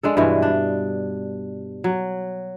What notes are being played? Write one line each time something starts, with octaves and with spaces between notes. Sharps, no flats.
G#3 D4 A4
G2 B2 E3 G#3
D4
F#3